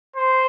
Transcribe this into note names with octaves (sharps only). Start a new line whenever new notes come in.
C5